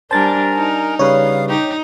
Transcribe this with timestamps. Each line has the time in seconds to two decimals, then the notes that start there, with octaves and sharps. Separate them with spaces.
0.11 G3 D4 A#4 C5 G#5 A5 A6
0.54 D#4
0.99 C#3 G3 B4 C#5 F5 D#6
1.49 D#4 G4